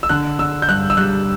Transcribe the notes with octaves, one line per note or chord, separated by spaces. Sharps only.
E6
D3 F#6
D3 E6
G6
G2 F#6
E6
G3 F#6